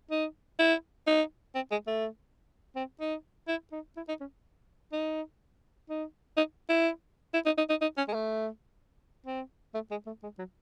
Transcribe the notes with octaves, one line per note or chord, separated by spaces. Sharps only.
D#4
E4
D#4
C4
G#3
A3
C4
D#4
E4
D#4
E4
D#4
C#4
D#4
D#4
D#4
E4
E4
D#4
D#4
D#4
D#4
C#4
G#3
A3
C4
A3
G#3
A3
G#3
F#3